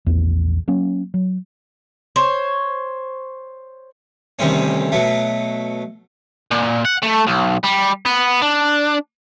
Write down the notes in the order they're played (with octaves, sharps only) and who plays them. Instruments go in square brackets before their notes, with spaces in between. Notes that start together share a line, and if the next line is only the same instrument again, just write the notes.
[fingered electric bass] A#1 E2
F#3 A#3 C#4
F#3
[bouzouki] C5 C#5
[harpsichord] D2 C3 D#3 G3 G#3 C#4
B2 F#3 A3
[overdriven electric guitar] A#2
F#5
A3
B1
G3
B3
D4